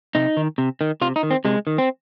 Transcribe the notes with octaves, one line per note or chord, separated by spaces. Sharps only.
C3 D#4
D#3
C3
D#3
C3 F4
D#4
D#3
C4
C3 G#3
D#3
C4